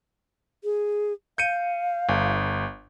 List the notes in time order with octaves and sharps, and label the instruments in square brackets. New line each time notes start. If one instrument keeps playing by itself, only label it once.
[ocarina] G#4
[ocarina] F5 [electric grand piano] G6 C#7 D#7
[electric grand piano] G1